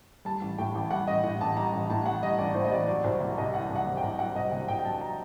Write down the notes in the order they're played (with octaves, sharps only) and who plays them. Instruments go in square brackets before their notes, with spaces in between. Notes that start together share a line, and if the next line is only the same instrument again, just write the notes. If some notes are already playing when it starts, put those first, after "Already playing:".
[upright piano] G3 A5
A1
A2 G5
A1
G3 F#5
A1 D#5
A2 F#5
A1 A5
G3 A#5
A1
A2 A5
A1 F#5
G3 D#5
A1 D5
A2 C5
D#5
A1 D5
F#3 D5
C2 C5
C3
C2 D#5
F#3 F#5
C2
F#5
C3
G5
C2
F#3 F#5
C2 D#5
C3 F#5
C2 G5
G5
F#3 A5
A#5